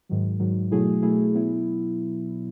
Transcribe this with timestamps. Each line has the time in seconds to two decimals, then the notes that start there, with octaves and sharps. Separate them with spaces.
0.09 G#2 D#3 F#3
0.40 G#2 D#3 F#3
0.71 B2 F#3 A3 E4 G#4
1.03 B2 F#3 A3 E4 G#4
1.34 B2 F#3 B3 E4